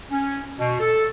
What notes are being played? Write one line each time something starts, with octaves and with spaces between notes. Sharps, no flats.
C#4
B2
A4